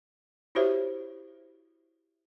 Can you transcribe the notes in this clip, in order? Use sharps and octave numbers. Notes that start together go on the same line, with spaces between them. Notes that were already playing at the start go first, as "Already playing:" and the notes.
E4 F#4 G4 C5 C#5 E5